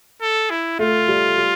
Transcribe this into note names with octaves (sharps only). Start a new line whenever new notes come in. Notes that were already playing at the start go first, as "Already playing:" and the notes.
A4
E4
A3 F4
G3
G3